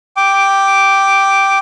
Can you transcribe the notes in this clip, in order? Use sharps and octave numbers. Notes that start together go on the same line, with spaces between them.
G5 D6